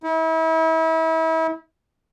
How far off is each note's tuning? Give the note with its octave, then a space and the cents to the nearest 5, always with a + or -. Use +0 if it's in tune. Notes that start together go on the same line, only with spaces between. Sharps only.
E4 -35